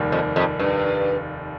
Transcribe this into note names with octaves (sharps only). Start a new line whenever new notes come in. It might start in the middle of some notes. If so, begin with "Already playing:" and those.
Already playing: F1 D#2 D#3 G3
F2
F2
G2